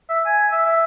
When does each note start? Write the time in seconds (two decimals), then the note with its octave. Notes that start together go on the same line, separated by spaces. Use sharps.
0.09 E5
0.26 G#5
0.52 E5
0.66 E5